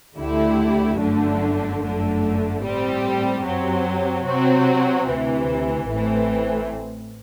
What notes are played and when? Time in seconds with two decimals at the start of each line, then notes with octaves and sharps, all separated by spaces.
0.18 D2 D3 A3 E4 G4
0.99 G1 F#2 D3 A3 D4
1.81 G1 F#2 D3 A3
2.63 A2 G3 C4 G4
3.45 F#2 F#3 C4 G4
4.26 C3 F#3 C4 F#4
5.08 D2 C3 E3
5.90 A1 A2 E3 A3 C4